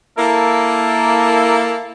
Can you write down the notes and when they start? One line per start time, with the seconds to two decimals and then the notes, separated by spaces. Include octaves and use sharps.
0.17 A#3 E4 A4